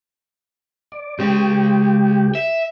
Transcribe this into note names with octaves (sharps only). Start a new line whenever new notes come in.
D5
C#2 C#3 G4
E5